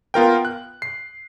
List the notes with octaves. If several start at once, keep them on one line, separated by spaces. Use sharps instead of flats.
B3 F4 A#4 G5
F#6
C7